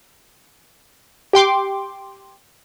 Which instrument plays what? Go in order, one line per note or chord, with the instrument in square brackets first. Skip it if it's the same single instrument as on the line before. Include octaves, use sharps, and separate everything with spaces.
[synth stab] G4 G5 C6 D6